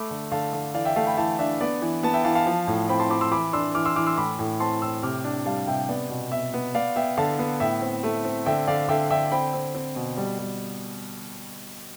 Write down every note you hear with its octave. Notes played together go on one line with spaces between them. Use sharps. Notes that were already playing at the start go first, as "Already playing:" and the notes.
Already playing: A3 B5 D6
D3
D3 F5 A5
D3
E3 D5 F5
E5 G5
A3 F5 A5
G5 B5
E3 F5 A5
D4 E5
B3 D5
E3
B3 A5
E5 G5
E3 F5 A5
F5 A5
F3
A2
C4 G5 B5
A5 C6
C4 B5 D6
C6 E6
E3 B5 D6
D4 C6 E6
E3 D6 F6
C6 E6
E3 D6 F6
C6 E6
A2 B5 D6
A2
C4 A5 C6
A2 C6 E6
C3 D6 F6
D4
G3 F5 A5
C3 E5 G5
B3 D5
B2
B2 E5
B3
B3 D5 F5
B3 E5 G5
D3 F5 A5
B3
A2 E5 G5
C4
A3
C4
D3 E5 G5
D3 D5 F5
D3 E5 G5
D3 E5 G5
C4 G5 B5
C4
C4
B2
G3
G3